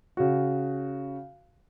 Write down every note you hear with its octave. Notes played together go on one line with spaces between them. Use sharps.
C#3 F#4